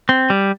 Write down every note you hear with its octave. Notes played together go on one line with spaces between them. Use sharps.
C4
G3